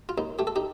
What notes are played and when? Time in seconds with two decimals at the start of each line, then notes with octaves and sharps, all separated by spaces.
0.09 F4
0.18 D#2 D#4
0.39 A3 G4
0.47 A4
0.56 D#4 G4